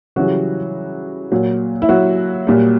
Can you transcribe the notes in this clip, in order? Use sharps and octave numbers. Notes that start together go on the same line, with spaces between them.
C#3 E3 F#3 G3 F#4
A#2 F#3
E4
F#3 F#4
A#2 G3